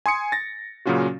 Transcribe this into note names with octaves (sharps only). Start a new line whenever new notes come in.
G#5 C6 D#6 C#7
A6 A#6
A#2 C#3 F#3 C#4 F4 F#4